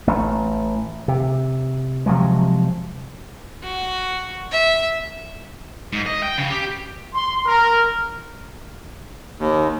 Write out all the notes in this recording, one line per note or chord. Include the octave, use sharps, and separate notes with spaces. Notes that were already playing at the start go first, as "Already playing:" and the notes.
A1 A3
C3
C3 F3 F#3 G#3
F#4
E5
G#2
D#5
G5
C#3
G4
C6
A#4
D#2